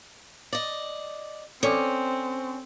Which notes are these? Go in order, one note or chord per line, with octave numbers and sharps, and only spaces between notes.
D5 D#5
C4 C#4 A4 D5 D6